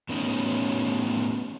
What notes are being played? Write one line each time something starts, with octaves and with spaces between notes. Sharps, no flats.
A2 B3 C#4 D#4 G4